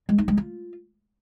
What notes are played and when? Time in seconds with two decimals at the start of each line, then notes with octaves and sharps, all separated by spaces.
0.09 G#3
0.18 D#4
0.28 G#3
0.37 F4